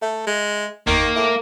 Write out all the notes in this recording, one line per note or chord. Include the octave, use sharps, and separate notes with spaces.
A3 E5
G#3
G1 E2 D#3 A#3
A2 E5